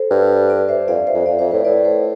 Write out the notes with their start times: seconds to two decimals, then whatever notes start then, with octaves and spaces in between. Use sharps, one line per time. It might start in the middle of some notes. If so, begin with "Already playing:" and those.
Already playing: A4 C5
0.11 G2
0.49 B4 D5
0.69 C5 E5
0.88 F2 D5 F5
1.07 C5 E5
1.14 F2
1.26 F2 D5 F5
1.39 F2 C5 E5
1.52 A2 B4 D5
1.65 A2 B4 D5
1.85 A4 C5